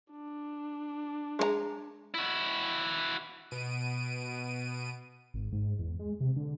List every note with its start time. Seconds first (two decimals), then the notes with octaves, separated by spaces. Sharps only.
0.12 D4
1.39 G#3 A#4 A#5
2.14 E4 F#4
3.51 B2 D7 D#7
5.34 G#1
5.52 G#2
5.79 E2
5.99 G#3
6.21 C3
6.36 D3